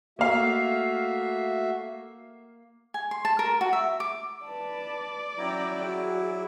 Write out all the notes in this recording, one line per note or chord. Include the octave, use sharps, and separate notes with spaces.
A3 A#3 F#4 E5 F5
G#5
C6
A5
A#4
F#4
E5
D6
B4 D5 A5
F#3 C#4 E4 G5 A#5
F#4 G#4